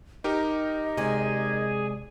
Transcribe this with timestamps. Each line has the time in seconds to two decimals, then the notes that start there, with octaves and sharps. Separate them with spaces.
0.24 D#4 G4 A#4 D#5
0.97 C3 G#3 G#4 D5 G#5